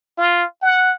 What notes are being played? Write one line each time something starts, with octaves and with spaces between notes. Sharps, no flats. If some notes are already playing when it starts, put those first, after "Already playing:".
F4
F#5